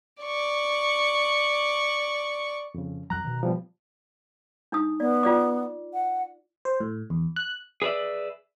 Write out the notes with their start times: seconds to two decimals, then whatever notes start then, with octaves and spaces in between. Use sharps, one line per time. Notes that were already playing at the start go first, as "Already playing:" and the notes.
0.22 D5 C#6
2.74 F2 C#3
3.10 F2 F#3 A#5 F#6
3.24 B2 D#3
3.43 F3 G3 B3
4.72 D4 D#4 D#6
5.00 B3 D5
5.23 F4 D5 D6
5.93 F#5
6.65 C5
6.80 A2
7.10 E2
7.36 F#6
7.82 G#4 B4 C#5 D5 E5